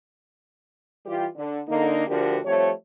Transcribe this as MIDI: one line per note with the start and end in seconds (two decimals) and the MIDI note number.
1.06 1.26 52
1.06 1.26 55
1.06 1.26 65
1.06 1.26 67
1.36 1.60 50
1.68 2.06 50
1.68 2.06 58
1.68 2.06 63
2.07 2.39 38
2.07 2.39 50
2.07 2.39 53
2.07 2.39 66
2.07 2.39 67
2.07 2.39 70
2.45 2.70 53
2.45 2.70 55
2.45 2.70 57
2.45 2.70 60
2.45 2.70 73